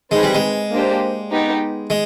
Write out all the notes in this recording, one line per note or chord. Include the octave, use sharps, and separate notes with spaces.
G#3 C4 D#4 G#4 B4
G3
G#3
A#3 D4 G4 C5
B3 D#4 G4
G#3